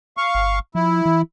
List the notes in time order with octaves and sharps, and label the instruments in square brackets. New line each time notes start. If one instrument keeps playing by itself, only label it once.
[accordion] F5 C#6
[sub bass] G1
[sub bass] F3 [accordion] E4
[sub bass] E3